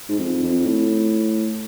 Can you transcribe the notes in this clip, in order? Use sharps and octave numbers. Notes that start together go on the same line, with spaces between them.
G#2
F2
F2
A2